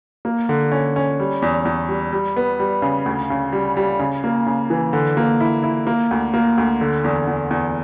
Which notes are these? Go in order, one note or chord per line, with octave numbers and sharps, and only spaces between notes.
A#3
D3
C#4
C#4
G3
E2
E2
G3
G3
B3
G3
C#3
D2
C#3
G3
G3
C#3
A#3
C#3
E3
D3
A#3
E4
E4
A#3
D2
A#3
D2
D3
E2
E2
E2